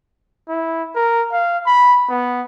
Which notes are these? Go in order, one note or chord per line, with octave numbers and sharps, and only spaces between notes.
E4
A#4
F5
B5
B3